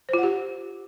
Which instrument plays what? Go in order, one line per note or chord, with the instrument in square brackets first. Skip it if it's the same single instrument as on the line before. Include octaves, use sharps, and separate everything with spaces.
[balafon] C5
F4
F#5
G4